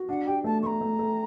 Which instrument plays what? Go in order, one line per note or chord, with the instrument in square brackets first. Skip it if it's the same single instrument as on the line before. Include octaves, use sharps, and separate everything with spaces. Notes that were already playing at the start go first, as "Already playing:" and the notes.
Already playing: [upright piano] F#4
[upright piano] D4 [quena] F#5
[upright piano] G4 [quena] G5
[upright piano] A3 [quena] A5
[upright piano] A3 [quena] A#5 C#6
[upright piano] A3
A3